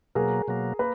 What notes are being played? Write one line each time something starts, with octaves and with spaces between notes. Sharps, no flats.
B2 F#3 A#3 G#4 A#4
B2 F#3 A#3
A#3 B4